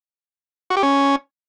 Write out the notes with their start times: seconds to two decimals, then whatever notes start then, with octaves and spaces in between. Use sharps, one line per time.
0.70 F#4
0.77 G4
0.83 C#4